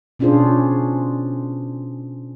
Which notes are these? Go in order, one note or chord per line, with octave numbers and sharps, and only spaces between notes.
B2 C#4 D4 F4 G#4 C5